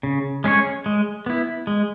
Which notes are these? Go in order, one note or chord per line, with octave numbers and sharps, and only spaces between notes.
C#3
G#3 C#4 G#4 C#5
G#3
B3 E4
G#3